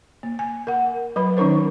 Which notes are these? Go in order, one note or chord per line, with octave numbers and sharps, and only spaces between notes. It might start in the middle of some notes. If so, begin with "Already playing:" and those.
A#3
G#5
A#4 F#5
F#3 B4 B5
D#3 C#4 D#4 A#4 C5